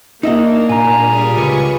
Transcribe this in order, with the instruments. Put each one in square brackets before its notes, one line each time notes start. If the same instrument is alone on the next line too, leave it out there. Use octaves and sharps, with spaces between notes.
[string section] A#3 D4 [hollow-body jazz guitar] D#4 E5 F#5 [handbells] D#5
[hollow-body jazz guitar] A#2 [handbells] G#5 A#5
[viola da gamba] G3 F4 G#4
[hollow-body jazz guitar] C#2 [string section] B4 C#6